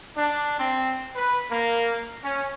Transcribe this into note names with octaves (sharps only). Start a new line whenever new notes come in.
D4
C4
B4
A#3
C#4